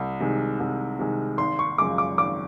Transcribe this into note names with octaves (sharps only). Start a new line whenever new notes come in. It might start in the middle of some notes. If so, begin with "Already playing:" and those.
Already playing: C2
C3 D#3 G#3
C2
C3 D#3 G#3
G#1 C6
C#6
F#2 C#3 F3 G#3 D6
D6
G#1 D6